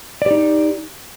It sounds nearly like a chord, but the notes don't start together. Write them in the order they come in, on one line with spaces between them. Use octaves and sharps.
D5 G4 D#4